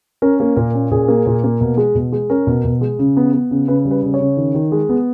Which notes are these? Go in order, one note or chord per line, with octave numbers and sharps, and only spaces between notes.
C#4 A#4
A#3
A#2 A#4
C#4
A#2 G#4
A#3
A#2
A#3
B2
G#3
B2
G#3
C#4 A#4
B2
B2
G#3
C#3
B3
B3
C#3
C#3 B4
G3
B4
C#3
C#5
C#3
D#3
D#3
G#3
B3